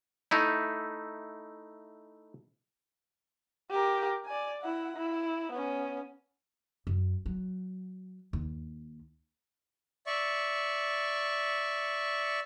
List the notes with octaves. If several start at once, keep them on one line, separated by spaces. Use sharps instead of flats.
A3 D#4 E4
G4 A#4
D5 G#5
E4 F#5
E4
B3 C#4
F#2
F#3
D#2
D5 E5 C#6